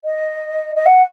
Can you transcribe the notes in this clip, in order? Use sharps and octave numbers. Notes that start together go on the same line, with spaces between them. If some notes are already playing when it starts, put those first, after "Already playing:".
D#5
D#5
F#5